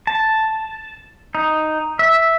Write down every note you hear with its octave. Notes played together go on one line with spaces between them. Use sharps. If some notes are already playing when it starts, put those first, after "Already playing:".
A5
D#4
E5